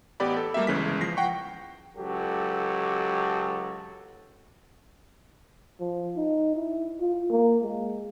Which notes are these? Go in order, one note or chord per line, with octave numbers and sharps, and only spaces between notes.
A1 B3 G4 D5 B5
A4
G3 A3 A#3 G4 E5
G1 C#3 E3 G#3 B6
F3 A#6 C7
F#5 G5 C#6
C#2 F#3 G4 A4
F3
D#4
E4
F4
A#3
G#3